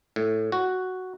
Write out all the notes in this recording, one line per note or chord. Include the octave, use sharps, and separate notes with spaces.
A2
F#4